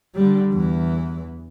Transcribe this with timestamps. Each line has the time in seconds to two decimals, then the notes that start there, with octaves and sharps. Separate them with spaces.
0.15 D3 G3
0.52 E2 E3